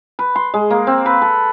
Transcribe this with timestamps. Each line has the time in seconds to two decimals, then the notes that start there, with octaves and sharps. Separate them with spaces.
0.19 B4
0.36 C6
0.54 G#3
0.71 A#3
0.87 C4
1.06 B4
1.22 A4